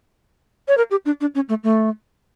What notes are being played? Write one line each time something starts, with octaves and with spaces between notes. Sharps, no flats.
C#5
A#4
G4
D4
D4
C#4
A3
A3